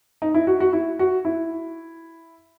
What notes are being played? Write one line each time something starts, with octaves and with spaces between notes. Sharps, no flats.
D#4
E4
F#4
F#4
E4
F#4
E4